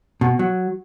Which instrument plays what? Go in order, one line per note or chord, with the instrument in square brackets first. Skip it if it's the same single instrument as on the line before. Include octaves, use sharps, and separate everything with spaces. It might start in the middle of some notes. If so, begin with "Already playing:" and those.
[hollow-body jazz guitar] B2
F#3